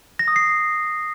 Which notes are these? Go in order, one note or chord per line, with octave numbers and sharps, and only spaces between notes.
A#6
D#6
C7